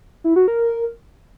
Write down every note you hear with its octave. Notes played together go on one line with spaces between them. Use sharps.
E4
F#4
A#4